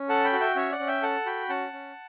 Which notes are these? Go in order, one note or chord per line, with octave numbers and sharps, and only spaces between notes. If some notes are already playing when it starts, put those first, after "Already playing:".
Already playing: C#4
A4 F#5 A5
G5 B5
F#4
E5 G5
C#4 C#5 E5
D5 F#5
C#4
E5 G5
A4 F#5 A5
F#4 G5 B5
C#4 F#5 A5
C#4